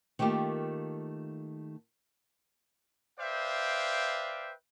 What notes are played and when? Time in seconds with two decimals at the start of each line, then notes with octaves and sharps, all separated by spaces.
0.19 D#3 A3 A#3 F4 G4
3.19 B4 C5 D5 E5 F5 G5